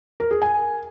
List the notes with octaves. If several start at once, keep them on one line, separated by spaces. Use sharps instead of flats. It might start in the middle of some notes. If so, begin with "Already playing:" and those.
A#4
G#4
G#5